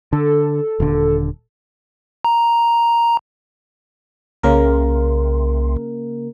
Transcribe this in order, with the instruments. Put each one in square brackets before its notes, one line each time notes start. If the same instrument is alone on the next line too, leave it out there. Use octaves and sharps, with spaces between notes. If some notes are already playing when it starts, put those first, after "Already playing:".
[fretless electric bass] D3 [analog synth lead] A4
[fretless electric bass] D#1 D3
[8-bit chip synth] A#5
[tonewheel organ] C2 [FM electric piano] C#3 A#3 A#4